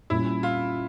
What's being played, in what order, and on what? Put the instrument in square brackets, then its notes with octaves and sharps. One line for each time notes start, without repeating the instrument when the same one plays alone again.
[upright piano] A#2 G3 C#4 [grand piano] E4
[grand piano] F4